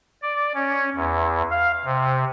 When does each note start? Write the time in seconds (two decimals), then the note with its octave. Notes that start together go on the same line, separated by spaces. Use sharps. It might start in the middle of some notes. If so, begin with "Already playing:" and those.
0.22 D5
0.55 C#4
0.96 E2
1.51 F5
1.85 C3